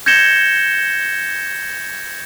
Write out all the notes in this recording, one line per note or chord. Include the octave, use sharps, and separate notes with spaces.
G6 G#6 A#6 C#7 E7 G7